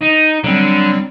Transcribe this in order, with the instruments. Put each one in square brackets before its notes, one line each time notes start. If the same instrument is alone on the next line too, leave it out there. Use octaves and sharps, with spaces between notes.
[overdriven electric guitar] D#4
[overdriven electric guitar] D3 [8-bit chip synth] F#3 G3 C4